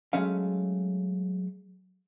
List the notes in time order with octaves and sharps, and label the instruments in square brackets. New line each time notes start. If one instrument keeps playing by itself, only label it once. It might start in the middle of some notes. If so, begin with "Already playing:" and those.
[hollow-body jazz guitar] F#3 G#3 A3 C#4 F5